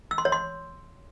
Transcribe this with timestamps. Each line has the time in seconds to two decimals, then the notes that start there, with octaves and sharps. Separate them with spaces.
0.11 E6
0.18 C6
0.25 C#5
0.32 C6